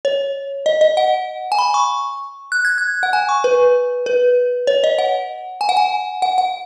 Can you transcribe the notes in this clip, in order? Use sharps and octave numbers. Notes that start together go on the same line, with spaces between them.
C#5
D#5
D#5
F#5
G#5
B5
C#6
F#6
G#6
F#6
F#5
G#5
C#6
B4
B4
C#5
D#5
F#5
G#5
F#5
G#5
F#5
F#5